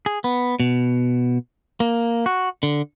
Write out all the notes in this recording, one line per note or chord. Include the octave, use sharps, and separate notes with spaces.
G#4
B3
B2
A#3
F#4
D3